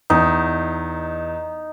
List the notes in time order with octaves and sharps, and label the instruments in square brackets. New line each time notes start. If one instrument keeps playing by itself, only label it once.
[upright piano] E2 [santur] D#4